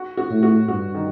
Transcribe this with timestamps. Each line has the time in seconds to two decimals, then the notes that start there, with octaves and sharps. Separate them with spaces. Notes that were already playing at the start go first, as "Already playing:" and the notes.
Already playing: F#4
0.17 F#4
0.30 A2
0.43 F#4
0.68 G2 F#4
0.94 D#3